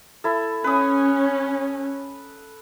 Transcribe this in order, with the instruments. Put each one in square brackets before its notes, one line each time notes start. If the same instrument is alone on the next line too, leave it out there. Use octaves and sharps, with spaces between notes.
[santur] E4 A4
[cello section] C#4 [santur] B4 D#6